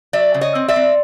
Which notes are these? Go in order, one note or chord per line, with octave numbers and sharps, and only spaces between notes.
F#3 D5 E5
C#3
C#5 D#5
C4
D5 E5
C4